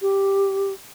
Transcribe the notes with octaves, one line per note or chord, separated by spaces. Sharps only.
G4